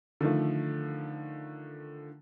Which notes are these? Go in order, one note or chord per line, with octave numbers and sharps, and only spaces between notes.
D3 D#3 F3 A3